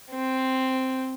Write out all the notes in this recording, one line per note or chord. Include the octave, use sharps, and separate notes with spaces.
C4